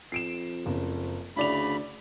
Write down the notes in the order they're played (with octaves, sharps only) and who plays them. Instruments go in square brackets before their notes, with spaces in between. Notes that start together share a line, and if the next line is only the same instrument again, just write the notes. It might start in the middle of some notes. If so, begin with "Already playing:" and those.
[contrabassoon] F2 [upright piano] C7 D7 E7
[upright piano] F#1 C#3
[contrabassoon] D2 [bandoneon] C#3 B5 [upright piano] E4 D5 F7